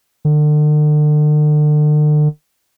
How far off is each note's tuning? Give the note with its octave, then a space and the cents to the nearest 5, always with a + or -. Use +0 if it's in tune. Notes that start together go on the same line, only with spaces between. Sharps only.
D3 +40